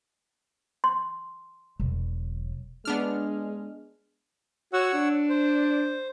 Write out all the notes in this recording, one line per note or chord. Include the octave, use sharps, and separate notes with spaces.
C6
E1 F#3
G#3 B3 D4 F6
F#4 C#5 F#5 E6
D4
C5